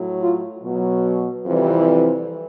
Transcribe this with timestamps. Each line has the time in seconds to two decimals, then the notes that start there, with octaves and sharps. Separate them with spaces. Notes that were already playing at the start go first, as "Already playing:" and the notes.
Already playing: A2 F#3
0.21 F4
0.63 B2 F#3
1.46 F2 C3 E3 G3